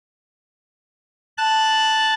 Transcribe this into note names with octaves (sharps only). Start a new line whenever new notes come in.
A5 F#6